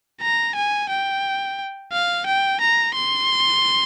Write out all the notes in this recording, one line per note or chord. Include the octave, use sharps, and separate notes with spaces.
A#5
G#5
G5
F5
G5
A#5
C6